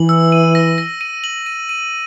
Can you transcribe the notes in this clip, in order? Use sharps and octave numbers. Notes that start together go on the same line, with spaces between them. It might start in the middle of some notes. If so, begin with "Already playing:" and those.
Already playing: E3 F#7
E6
D#7
A#6
A#6
D#7
F#7
D#7
D#7